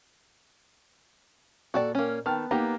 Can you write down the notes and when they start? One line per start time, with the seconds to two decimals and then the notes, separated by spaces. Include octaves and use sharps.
1.74 A#2 F#4 A4 D5
1.95 A#3 C#4
2.26 D#3 B3 A5 F6
2.51 A#3 B3 D#4 G4 A#5